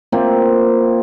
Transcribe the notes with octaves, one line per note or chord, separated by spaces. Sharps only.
A#3 C4 F4 E5